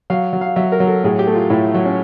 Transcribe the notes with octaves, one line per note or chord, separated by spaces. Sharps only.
F#3 F5
F#3
F5
F#3 E5
A#4
F#3
A4
A2 G#4
G4
A3
F4
A2 E4
F#3
C#4